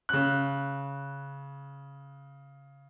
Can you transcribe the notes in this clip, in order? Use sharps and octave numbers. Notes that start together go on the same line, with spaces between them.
C#3 F#6